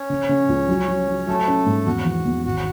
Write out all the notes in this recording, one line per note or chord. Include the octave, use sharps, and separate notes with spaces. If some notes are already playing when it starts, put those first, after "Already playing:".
Already playing: C#4 C#5
C#3
C#3
C#2
F#3
F#3
F#3
F#3 A3 A4
C#4
G#2
E2 F#4
E3
E2
G#1 F#4